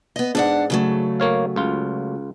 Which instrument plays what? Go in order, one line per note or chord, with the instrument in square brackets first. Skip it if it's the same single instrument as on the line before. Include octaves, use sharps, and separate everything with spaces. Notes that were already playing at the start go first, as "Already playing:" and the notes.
[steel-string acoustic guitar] B3 D#5
[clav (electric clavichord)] G#2 [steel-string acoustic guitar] D4 D5 F#5
[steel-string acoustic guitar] C#3 F#3 A3
[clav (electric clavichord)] A#3 C#5 F5
C#2 F4